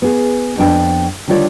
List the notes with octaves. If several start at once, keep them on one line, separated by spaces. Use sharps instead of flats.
B3 G#4
F2 B3 D4 G5
D3 D#3 G3 F4 C#5 D5